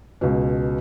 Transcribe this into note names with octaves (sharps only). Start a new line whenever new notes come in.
C#2 B2